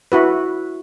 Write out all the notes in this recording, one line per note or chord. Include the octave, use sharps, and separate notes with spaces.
E4 F#4 B4